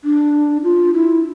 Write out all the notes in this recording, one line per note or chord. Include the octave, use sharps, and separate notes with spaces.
D4
F4
E4